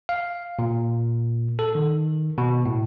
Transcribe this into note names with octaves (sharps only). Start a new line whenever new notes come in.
F5
A#2
A4
D#3
B2
A2